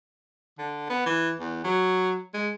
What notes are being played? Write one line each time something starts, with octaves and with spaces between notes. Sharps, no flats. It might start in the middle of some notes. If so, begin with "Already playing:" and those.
D3
B3
E3
E2
F#3
G#3